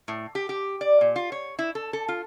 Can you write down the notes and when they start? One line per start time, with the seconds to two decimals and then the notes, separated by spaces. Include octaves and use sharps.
0.08 A2
0.35 G4
0.49 G4
0.81 D5
1.01 A#2
1.16 F4
1.32 C#5
1.59 E4
1.75 A4
1.93 A4
2.08 F4